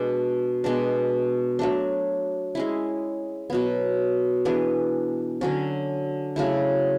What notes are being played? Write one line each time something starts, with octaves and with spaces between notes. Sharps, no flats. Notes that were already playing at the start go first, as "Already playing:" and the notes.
Already playing: B2 G#3 D4
B2 G#3 B3 D4
F#3 A3 D4
G#3 C#4 E4
B2 F#3 B3
E3 B3 D4 G#4
D3 F#3 C#4
C#3 F#3 A3 E4